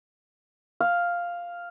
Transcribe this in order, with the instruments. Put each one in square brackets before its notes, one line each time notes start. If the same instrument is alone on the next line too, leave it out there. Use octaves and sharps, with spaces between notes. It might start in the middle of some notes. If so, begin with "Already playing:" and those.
[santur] F5